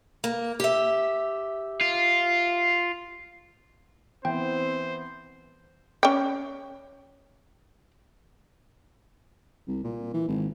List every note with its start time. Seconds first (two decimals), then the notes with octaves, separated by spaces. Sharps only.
0.24 A#3
0.60 G4 E5
1.81 F4
4.25 E3 B3 C4 C5 G5
6.03 C#4 G5
9.68 C2
9.84 A#2
10.13 E3
10.28 G#1